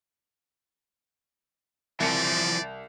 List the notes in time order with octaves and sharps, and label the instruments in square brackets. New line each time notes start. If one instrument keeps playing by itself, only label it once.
[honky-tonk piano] C2 C#7 [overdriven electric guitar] E3 F3 [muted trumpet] D5